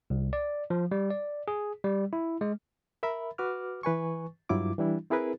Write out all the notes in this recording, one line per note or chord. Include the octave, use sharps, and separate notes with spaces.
C2
D5
F3
G3
D5
G#4
G3
E4
G#3
A#4 E5 B5
F#4 B4 D6 F6
E3 B4 G#5 C#6
G2 F#3 E4 F4 D6
E3 G3 D4 E4
C4 E4 G#4 A#4 B4